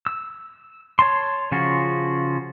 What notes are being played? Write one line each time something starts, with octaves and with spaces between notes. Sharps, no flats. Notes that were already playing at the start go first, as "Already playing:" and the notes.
E6
C#5 A5 C6
C#3 F3 C#4 F4 F#4